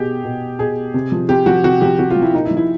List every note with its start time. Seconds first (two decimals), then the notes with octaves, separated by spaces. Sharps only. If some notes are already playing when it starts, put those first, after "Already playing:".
Already playing: B2 G4 G#4
0.24 B2
0.59 B2 G#4
0.94 C3
1.12 F3
1.29 C3 G4
1.46 F3 F#4
1.64 C3 F#4
1.81 F3 G4
1.99 C3 F#4
2.11 F4
2.16 F3
2.22 E4
2.33 A#2 D#4
2.45 E4
2.51 F3
2.57 E4